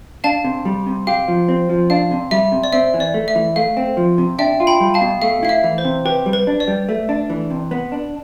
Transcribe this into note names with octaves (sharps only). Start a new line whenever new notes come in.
D4 F5 A5
C3
G3
C3
G4 F5
F3
C4
F3
D4 F5
C3
G3 E5
C3
D5
C4 E5
E3
D5
A3
E5
E3
A3 F5
C4
F3
C3
D4 E5 G5
F4
G5 B5
G3
F5 A5
B2
A3 F5
E4 F5
E5
E3
C5
C3
G4 B4
G3
B4
D4
D5
G3
A3
D4
E3
C3
B3
D4